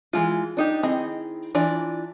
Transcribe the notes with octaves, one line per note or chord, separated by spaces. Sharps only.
E3 G#3 F4
D4 D#4 G4
D#3 C4 E4 G#4 D#5
E3 D4 F4 D5